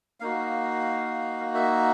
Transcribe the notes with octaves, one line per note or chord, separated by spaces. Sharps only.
A#3 D#4 F#4 F5
E5